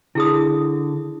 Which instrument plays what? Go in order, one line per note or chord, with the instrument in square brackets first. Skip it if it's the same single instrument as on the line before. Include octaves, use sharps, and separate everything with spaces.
[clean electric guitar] D3 [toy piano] E4 G#4 D#6